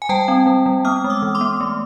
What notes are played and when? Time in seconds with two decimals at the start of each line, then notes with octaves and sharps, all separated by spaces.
0.02 G#5
0.09 G3 G5 A5
0.28 C4
0.46 G3
0.66 G3
0.85 B3 D#6 F6
1.04 G#3
1.10 D6 E6
1.22 E3
1.35 C6 D6
1.41 B3
1.61 A3